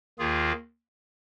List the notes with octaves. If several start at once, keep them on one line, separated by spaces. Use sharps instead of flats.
D#2 D#3 A#3 F4 G#4